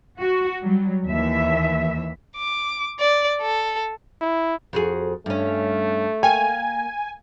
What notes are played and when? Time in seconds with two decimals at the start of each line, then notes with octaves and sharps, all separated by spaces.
0.19 F#4
0.62 F#3 G3
1.05 D#2 E3 E5
2.36 D6
3.00 D5
3.41 A4
4.21 E4
4.73 F2 F#4 G#4
5.26 G2 A3 C#4
6.23 A#3 G5 G#5